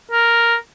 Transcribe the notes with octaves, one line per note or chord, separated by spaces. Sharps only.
A#4